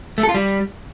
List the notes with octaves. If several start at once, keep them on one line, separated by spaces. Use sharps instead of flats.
A3
A4
F4
G3